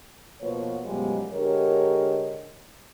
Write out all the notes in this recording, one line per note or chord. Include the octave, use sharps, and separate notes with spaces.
B2 F3 A#3 B3 C#5
F#2 B2 F3 G3 G#3 B3
D3 G#3 G4 A#4 C#5 D#5